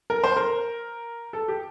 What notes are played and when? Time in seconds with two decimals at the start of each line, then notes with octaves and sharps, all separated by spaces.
0.10 A#4
0.24 C5
0.36 A#4
1.33 A4
1.48 G4